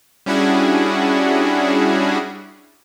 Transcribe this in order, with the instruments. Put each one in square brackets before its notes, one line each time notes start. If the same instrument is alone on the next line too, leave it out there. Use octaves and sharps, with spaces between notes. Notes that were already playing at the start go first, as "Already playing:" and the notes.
[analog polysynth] G3 C#4 D4 E4 F#4 G#4